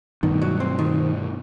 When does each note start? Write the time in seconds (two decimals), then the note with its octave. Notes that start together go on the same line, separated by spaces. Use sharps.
0.23 G2 B2 D#3
0.42 F#3
0.60 C4
0.79 D#3